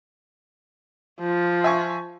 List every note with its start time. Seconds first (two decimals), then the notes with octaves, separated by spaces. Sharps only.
1.20 F3 F4
1.64 E5 G#5 C#6